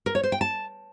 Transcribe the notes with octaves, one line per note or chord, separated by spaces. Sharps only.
A#4
C#5
C5
G5
A5